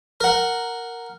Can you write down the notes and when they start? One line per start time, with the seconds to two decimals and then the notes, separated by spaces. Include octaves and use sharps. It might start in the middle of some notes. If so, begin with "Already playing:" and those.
0.21 A#4 F#5